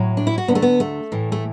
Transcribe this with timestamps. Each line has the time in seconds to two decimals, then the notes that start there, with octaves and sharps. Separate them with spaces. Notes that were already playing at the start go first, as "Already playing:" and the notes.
Already playing: A2 F#3
0.17 D4
0.27 E4
0.38 F#4
0.48 D2 D3 F#3 B3
0.55 A3
0.62 B3
0.80 A3
1.12 A2 E3
1.32 A3